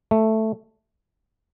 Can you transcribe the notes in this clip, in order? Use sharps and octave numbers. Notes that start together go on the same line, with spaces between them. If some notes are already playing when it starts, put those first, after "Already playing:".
A3